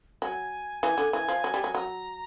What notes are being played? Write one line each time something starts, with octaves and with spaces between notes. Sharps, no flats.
F#3 G#5
E3 G#5
D3
E3 G#5
F3
F#3
G3
F#3
F#3 A#5